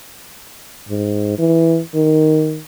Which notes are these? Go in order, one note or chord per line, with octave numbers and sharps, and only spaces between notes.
G#2
E3
D#3